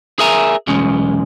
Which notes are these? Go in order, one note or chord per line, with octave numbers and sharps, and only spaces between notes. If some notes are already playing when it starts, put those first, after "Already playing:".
G#4 A#4 E5 G#5 A#5
B1 E2 G#3 C#4